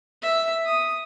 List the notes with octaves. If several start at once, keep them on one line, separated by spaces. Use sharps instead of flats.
E5
D#6